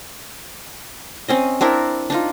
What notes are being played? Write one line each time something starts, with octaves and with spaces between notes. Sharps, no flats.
C4 C#4 D#5
C4 D4 E4 A#4
D4 D#4 F4